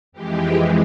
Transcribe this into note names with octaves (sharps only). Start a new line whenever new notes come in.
F2 E3 G#3 G4